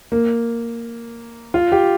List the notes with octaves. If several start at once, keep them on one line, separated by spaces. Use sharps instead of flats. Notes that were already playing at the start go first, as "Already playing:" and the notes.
A#3
F4
G4